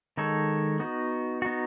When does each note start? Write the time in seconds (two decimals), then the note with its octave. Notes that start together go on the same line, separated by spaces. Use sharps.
0.17 D#3 G#3 D#4 A4 C#5
0.80 B3 D#4 F#4
1.42 B3 D#4 F#4